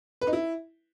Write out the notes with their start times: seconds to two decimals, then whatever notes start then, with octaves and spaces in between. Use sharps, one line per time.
0.21 B4
0.27 D#4
0.33 E4